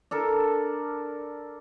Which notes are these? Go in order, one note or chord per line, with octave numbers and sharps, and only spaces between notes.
D4 A4 A#4